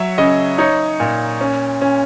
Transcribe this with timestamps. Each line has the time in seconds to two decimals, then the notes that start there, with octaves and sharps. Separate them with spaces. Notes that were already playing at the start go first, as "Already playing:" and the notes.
Already playing: F#3 C#5 E5
0.18 C#3 D#5
0.58 D#4 C#5
1.00 A#2
1.41 C#4
1.81 C#4